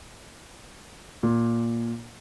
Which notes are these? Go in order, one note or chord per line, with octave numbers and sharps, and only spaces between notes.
A#2